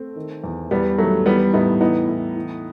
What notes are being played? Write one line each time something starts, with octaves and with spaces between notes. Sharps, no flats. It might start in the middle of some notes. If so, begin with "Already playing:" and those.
Already playing: A3 C4
D#3
E2
E2 G3 B3
D#3 F#3 A3
E3 G3 B3
A2 B3 D#4
E3 B3 D#4
A2
E3